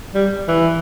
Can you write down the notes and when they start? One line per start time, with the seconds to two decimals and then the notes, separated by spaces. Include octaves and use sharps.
0.15 G3
0.48 E3